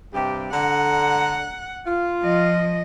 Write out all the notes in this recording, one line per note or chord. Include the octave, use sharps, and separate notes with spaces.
G2 C3 G4
D3 F#5 A#5
F4
F3 D#5